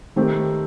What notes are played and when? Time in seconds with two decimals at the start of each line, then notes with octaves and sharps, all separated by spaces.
0.16 D#3 A3 C4 G4